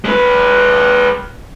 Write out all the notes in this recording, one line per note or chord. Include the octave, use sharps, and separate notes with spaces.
G#3 B4